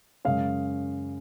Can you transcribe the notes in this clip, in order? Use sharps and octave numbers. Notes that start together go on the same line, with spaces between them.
F#2 C#3 G#3 C#4 F5